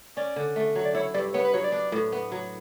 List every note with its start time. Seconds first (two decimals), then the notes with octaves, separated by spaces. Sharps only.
0.17 C#4 D5
0.36 D3
0.56 A3
0.75 F#3
0.85 D5
0.95 E4 C#5
1.14 G2 D5
1.34 B3 C#5
1.44 B4
1.53 F#3 C#5
1.64 D5
1.72 D4
1.92 A2
2.12 B3
2.32 F#3